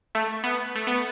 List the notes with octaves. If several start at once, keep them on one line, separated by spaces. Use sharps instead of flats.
A3
B3
A3
B3